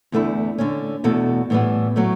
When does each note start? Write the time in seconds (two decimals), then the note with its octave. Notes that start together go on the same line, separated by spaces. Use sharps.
0.12 E2 D3 A3 E4
0.58 D3 A3 C#4
1.04 E2 B2 A3 E4 A4
1.50 A2 E3 G3 B3
1.96 A2 F#3 A3